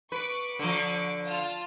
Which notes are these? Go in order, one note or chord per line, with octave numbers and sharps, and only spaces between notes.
B4 C#6 D6 D7
D3 F3
F4 A5 F6